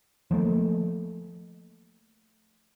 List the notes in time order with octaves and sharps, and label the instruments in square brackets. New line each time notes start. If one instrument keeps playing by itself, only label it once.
[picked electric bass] F3 F#3 A3 A#3